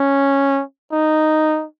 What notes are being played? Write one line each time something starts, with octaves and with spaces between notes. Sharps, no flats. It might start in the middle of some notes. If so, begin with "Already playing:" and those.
Already playing: C#4
D#4